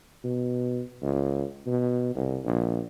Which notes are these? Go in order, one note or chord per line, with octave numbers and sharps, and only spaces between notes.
B2
C#2
B2
C2
A#1